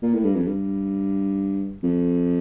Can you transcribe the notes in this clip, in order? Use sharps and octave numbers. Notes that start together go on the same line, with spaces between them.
A#2
A2
G2
F2
G2
F2